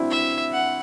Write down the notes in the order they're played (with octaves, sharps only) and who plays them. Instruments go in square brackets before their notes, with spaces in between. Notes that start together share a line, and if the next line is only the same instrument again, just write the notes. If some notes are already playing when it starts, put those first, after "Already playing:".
Already playing: [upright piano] C4 D4 E4 F#4
[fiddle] E5
F#5